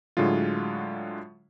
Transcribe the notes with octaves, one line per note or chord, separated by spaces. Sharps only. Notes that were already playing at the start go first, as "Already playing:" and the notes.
A2 D3 F#3 G#3 F4